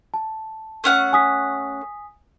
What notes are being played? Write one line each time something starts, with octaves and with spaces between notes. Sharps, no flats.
A5
A3 C#4 F#5
G#5 D#6 B6